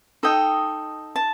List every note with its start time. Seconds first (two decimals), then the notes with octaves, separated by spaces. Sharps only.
0.23 D#4 A4 D#5 G5
1.16 A5